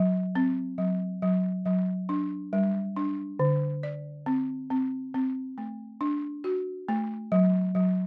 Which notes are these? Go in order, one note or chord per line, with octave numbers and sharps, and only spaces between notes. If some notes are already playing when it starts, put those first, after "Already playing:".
Already playing: F#3
C4
F#3
F#3
F#3
D4
G3
D4
D3
D5
C4
C4
C4
A3
D4
F#4
A3
F#3
F#3